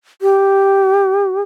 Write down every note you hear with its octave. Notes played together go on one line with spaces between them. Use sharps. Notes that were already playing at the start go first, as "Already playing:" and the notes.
G4